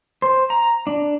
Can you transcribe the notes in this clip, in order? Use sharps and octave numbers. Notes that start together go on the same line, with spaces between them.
C5
A#5
D4